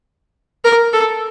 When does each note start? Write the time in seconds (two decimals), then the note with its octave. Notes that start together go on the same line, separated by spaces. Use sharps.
0.65 A#4
0.93 A4